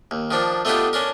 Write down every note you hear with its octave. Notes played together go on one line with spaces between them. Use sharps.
D#2
D#3 F3 D4
A3 B3 D4 D#4 F4 G4
C#4 D4 A#4